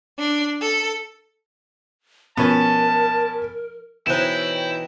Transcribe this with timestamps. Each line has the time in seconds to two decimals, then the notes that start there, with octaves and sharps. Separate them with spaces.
0.17 D4
0.60 A4
2.37 B2 F3 B3 C#4 A#4 A5
4.07 B2 E3 D#4 E4 C5 C#5 G5 E7